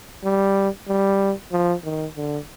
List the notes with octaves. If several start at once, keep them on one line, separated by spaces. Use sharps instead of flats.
G3
G3
F3
D#3
D3